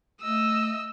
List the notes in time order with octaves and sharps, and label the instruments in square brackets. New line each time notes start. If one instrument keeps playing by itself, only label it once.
[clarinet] A3 [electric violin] D#5 E6